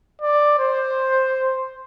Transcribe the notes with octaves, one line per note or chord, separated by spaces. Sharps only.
D5
C5